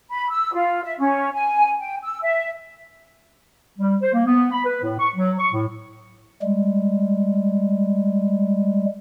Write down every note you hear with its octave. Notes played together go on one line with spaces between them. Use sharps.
B5
E6
F4
E5
C#4
G#5
G5
E6
E5
G3
C5
A#3
B3
B5
B4
A2
C#6
F#3
C#6
A2
G3 G#3